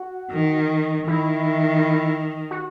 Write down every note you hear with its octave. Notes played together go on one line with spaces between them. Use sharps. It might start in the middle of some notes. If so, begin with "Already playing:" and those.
Already playing: F#4
D#3
D#3 E4
F#4